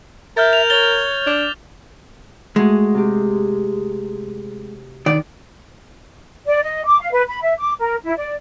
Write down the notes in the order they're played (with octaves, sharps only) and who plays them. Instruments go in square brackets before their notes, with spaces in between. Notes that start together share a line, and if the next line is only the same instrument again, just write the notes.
[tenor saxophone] A#4 [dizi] E5 [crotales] F6 G6 A6
[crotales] F7
[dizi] C#5 [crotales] A6 F7 G7
[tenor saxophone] D4 [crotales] D6
[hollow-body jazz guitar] G#3 [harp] A3 F#4 G#4
[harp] C3 G4
[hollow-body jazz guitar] D#3 D5
[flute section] D5
D#5
D6
F5
B4
B5
E5
D6
A#4
E4
D5